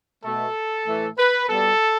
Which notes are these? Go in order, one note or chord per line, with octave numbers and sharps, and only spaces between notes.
B2 A3 A4
A2 E3 A3
B4
B2 G3 A4